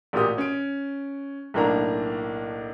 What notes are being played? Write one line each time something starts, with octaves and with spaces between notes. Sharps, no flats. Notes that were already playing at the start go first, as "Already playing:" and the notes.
A1 A#2 F#4 G4 D#6
C#4 D7
B1 A2 A#3 D4 A#5